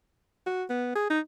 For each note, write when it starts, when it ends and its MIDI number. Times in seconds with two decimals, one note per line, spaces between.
0.46 0.64 66
0.69 0.92 59
0.95 1.08 68
1.10 1.20 63